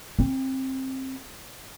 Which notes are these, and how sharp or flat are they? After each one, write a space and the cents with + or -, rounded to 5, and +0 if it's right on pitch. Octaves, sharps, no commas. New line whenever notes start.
C4 +20